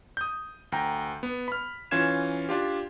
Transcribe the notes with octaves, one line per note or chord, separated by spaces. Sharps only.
D#6 G6
D2 G5 A#5
B3
B5 F6
E3 C#4 F4 F5 G#6 E7
D4 F4 G4